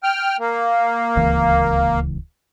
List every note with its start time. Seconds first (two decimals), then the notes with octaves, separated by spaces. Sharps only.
0.03 G5 F6
0.39 A#3
1.16 D1 C#2 E3